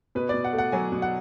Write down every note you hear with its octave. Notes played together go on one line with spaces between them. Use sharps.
B2 B4
B2 D5
F#5
A3
F#5
F#3 G#5
B2
F#5